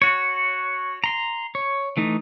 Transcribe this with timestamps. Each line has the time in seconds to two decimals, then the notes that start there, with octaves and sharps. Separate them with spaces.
0.02 F#4 C#5
1.04 A#5 C6
1.55 C#5
1.97 E3 A3 D#4